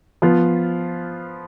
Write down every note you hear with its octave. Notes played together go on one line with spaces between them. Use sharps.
F3 B3 F4